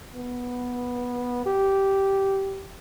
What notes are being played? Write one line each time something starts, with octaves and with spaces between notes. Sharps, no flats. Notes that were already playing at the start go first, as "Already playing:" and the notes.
B3
G4